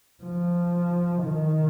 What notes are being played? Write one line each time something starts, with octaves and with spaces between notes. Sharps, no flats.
F3
D#3